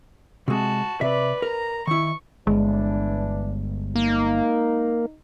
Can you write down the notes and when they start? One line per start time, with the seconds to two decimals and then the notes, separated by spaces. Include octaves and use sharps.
0.48 C3 G#3 F#4 A5
1.01 C3 B4 D5 E5
1.42 A#4 A#5
1.87 D#3 E4 C#6
2.47 G1 E3 G#3 D4
3.95 A#3 D#4